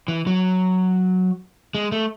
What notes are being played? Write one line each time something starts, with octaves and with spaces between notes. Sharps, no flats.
E3
F#3
G#3
A3